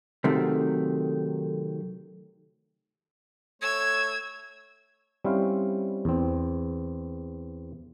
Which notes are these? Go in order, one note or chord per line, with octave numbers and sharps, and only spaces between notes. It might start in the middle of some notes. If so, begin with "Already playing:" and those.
C3 D#3 F#3 A3
A3 C#5 E6 G#6
G3 C4 C#4 E4 C5 F5
E2 C4